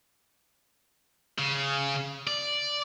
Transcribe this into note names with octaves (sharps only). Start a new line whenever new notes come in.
C#3
D5